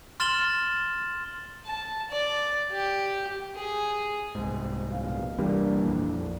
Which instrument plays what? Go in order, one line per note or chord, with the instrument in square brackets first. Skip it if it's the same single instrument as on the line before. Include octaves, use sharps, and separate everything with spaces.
[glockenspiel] C6 F6 A6 E7 F#7 G7
[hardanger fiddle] A5
D5
G4
G#4
[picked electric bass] C2 G#2
[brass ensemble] A#1 B2 F5
[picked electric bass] C2 G3 A#3 [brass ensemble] E3 D4
[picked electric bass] A#1 F2